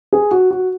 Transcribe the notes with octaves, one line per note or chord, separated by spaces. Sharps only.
G#4
F#4
F#4